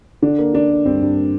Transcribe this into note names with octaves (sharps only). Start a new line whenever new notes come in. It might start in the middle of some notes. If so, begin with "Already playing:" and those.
D3 D4
A#3
D3 D4
A#3
G2 C4
G2
A#3